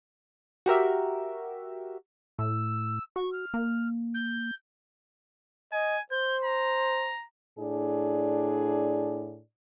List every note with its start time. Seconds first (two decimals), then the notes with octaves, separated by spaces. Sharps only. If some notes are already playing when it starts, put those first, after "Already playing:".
0.66 F#4 G4 A#4 E5
2.39 A2 E6
3.16 F#4 C#6
3.32 F6
3.54 A#3
4.14 G6
5.73 D#5 G#5
6.12 C5 G6
6.45 A#5
7.59 A2 D4 G#4 D5